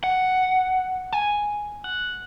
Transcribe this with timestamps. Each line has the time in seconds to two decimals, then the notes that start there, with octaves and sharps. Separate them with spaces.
0.04 F#5
1.13 G#5
1.84 F#5